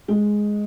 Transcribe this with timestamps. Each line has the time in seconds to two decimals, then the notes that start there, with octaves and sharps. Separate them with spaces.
0.08 G#3